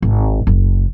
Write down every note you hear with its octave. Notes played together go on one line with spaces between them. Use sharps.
G#1
F#1